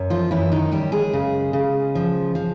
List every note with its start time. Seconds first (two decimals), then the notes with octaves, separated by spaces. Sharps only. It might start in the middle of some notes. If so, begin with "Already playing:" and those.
Already playing: F#2
0.10 F3 F4
0.31 F#2 E3 E4
0.52 D#3 D#4
0.72 F#2 G3 G4
0.92 G#3 G#4
1.13 C#3
1.53 C#3
1.95 F3
2.35 F3